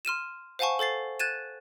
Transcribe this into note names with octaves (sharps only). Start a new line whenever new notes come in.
C6 F6 D#7 E7
C5 F5 F#5 G#5 A5 C#6
A4 C5 A6 C7
F#6 G#6 A6 D#7 E7